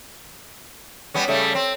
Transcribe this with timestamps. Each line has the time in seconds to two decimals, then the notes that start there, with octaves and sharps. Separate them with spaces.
1.14 G3 B3 C#4
1.28 C#3 G3 A3
1.55 C4